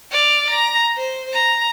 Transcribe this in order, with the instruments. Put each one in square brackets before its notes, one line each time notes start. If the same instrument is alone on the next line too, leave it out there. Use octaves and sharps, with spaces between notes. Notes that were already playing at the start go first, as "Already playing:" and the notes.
[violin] D5 F6
A#5
C5
A#5